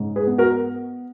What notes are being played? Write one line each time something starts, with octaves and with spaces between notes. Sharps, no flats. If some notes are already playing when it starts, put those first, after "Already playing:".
Already playing: G#2 C#3
G#4 B4
B3
F#4 A#4